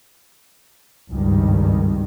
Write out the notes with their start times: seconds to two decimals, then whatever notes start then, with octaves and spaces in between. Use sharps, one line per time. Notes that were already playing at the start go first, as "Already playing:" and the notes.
1.10 G#1 C#2 G2 D#3 G3